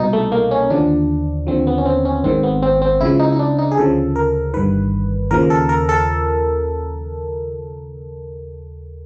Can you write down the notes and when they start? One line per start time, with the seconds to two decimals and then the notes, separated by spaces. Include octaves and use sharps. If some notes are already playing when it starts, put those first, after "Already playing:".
Already playing: C2 B2 D#4
0.13 A3
0.32 A#3
0.51 C#4
0.70 D#2 D3 F3 D4
1.47 D#2 D3 F3 C4
1.67 B3
1.78 C#4
1.85 C4
2.05 C#4
2.24 G#1 G#2 D#3 C4
2.43 B3
2.62 C4
2.82 C4
3.01 C#2 C#3 F3 E4
3.19 D#4
3.32 D#4
3.39 D4
3.58 D#4
3.71 G#4
3.77 D2 C#3 F3 A4
4.16 A#4
4.54 G1 G2 D#3 B4
5.31 D#2 C#3 F3 A#4
5.50 A4
5.69 A#4
5.89 A4